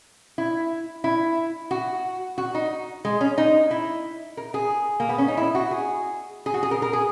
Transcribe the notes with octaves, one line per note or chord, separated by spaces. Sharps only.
E4
E4
F#4
F#4
D#4
G#3
C#4
D#4
E4
A#4
G#4
A#3
B3
C#4
D#4
E4
F#4
G#4
G#4
F#4
G#4
A#4
A#4
G#4